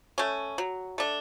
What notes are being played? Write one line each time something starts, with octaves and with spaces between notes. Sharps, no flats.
A3 C#4
F#3
A3 D4